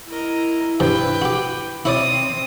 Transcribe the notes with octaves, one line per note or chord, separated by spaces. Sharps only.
E4 A#4 D#5
G2 F3 B4 G5
F#4 G4
C4 E4 C#5 D5 D#6